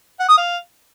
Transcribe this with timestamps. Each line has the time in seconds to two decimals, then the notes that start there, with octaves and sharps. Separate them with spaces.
0.20 F#5
0.28 D#6
0.37 F5